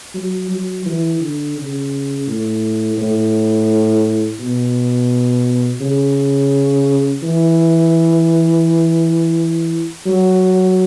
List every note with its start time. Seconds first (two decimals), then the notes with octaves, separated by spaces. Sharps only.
0.14 F#3
0.51 F#3
0.86 E3
1.20 D3
1.57 C#3
2.27 A2
2.98 A2
4.39 B2
5.81 C#3
7.23 E3
10.06 F#3